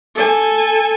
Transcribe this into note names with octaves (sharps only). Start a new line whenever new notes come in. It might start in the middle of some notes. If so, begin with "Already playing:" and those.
A4 G#5